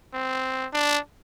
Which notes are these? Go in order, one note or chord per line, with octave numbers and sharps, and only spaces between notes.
C4
D4